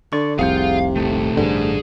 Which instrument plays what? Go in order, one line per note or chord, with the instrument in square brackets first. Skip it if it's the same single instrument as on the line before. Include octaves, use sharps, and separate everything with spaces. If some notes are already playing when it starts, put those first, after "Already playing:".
[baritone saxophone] D3 [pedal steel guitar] D5 C#6
[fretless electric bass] F1 C2 [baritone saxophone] C3 [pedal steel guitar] G#4 F#5 G6 [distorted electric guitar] F5 C6
[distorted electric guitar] A#2 D#3 [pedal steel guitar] A3
[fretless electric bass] A1 G2 D3 [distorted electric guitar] G#4 C5